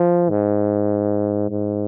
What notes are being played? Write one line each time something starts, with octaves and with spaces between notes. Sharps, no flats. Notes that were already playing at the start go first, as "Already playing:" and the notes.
Already playing: F3
G#2
G#2